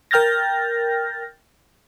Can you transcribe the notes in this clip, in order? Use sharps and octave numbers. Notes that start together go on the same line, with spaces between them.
A#4 G5 F6 G6 A6 A#6